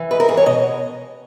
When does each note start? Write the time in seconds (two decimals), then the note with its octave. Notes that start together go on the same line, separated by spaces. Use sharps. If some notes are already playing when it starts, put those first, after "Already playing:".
Already playing: E3
0.11 G#2 B4
0.20 A#4
0.28 G#2 G#4
0.37 C#5
0.46 B2 D#5